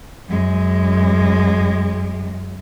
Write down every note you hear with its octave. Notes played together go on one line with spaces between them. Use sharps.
F#2 G#3